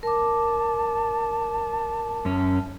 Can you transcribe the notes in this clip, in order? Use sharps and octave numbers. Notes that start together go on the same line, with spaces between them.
A#4 A5 D6
F#2 C#4